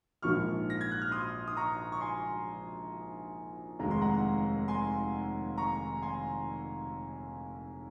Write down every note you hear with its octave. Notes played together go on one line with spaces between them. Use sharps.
A#1 G#2 F3 A#3 C#6 F6
A#6
G#6
F#6
F6
C6 D#6
D#6
A#5 C#6
C#6
G#5 C6
F1 D#2 D#3 G#3 A#5
C6
F#5 A#5
G#5 C6
A#5 C#6
G#5 C6